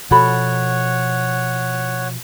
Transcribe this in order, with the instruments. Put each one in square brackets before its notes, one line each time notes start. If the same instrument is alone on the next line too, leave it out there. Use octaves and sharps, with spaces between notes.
[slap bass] B2 F3 [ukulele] F#4 A4 B5 [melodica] C#5 F#5